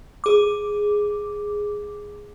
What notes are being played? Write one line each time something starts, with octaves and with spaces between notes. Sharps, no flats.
G#4 D6